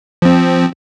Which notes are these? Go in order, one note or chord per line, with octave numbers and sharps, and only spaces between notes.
F3 C4